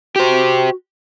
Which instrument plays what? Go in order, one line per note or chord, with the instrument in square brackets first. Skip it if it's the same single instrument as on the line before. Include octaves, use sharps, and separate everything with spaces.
[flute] F#4 [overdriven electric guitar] G4 C5